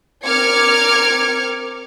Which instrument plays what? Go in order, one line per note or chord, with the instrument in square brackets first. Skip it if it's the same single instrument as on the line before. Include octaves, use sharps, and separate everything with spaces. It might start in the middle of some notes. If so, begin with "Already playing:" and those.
[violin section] C4 A#4 D6 F6 G#6 C#7